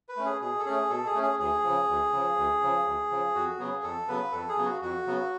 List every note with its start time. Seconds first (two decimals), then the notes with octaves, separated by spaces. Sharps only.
0.09 B4
0.17 A3 C#4
0.25 G#4
0.41 B2 G#4
0.59 A4
0.65 A3 C#4 G#4
0.90 B2 A4
1.07 G#4
1.15 A3 C#4
1.23 G#4
1.39 D2 G#4
1.63 C#3 F3
1.88 D2
2.12 C#3 F3
2.37 D2
2.61 C#3 F3
2.85 D2
3.10 C#3 F3
3.35 F2 F#4
3.59 C#3 F#3 B3 G#4
3.83 F2 A4
4.08 C#3 F#3 B3 B4
4.32 F2 A4
4.49 G#4
4.57 C#3 F#3 B3
4.65 F#4
4.82 F2 F#4
5.06 C#3 F#3 B3